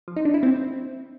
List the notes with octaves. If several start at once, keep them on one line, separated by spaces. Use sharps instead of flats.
F3
D#4
D4
E4
C4